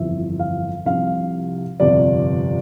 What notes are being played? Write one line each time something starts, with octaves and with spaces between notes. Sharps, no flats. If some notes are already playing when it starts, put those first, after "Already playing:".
Already playing: G1 F2 E3 E5
F5
C2 C3 F3 F5
G1 F2 C3 D5